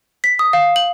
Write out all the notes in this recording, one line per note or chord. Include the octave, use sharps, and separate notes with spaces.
B6
D#6
F5
F#7